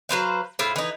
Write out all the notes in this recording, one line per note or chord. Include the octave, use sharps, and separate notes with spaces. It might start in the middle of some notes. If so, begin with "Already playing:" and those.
F#3 B4 C5 F5
A2 E4 F4 C5
E3 D#4